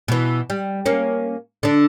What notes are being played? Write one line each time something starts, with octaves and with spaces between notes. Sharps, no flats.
B2 E3
G3
A#3 C#4
D3 D4